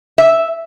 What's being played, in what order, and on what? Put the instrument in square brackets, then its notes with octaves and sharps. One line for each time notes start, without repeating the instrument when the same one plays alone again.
[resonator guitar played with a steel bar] E5